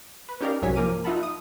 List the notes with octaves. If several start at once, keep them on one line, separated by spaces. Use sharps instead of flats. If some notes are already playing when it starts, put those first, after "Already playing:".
B4
C#4 D#4 G4 A#4 D5 F5
C2 G#2 F#3 C#5 G#5 B6
F3 A#3 A#4 D6 D#7
D#4 F4 E5 F#5 A5 B5
D#6